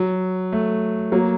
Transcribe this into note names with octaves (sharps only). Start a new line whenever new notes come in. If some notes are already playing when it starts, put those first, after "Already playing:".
Already playing: F#3
A3
F#3 A#3